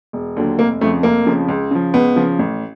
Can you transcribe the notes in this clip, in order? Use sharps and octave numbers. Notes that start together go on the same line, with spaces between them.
E1
D#2 D3 F#3
F1 A#3
F2 C#3 F3 A3
F1 A#3
F2 C#3 F3
C#2
C#3 F3
C#2 B3
C#3 F3
A1